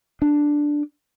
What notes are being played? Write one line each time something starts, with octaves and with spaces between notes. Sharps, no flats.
D4